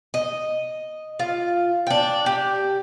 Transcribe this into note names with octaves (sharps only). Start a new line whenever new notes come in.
D#5
F4
D4 G5
G4